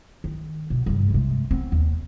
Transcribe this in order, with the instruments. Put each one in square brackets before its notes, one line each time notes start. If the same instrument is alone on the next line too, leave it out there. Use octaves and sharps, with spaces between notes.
[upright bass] D#3
B2
G2 C#3
C3 G#3
B3 C4
D#2